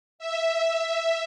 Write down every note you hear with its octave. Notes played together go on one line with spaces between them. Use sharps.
E5